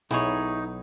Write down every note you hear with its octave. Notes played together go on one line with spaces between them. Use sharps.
B1 D#4 E4 G#4 C#5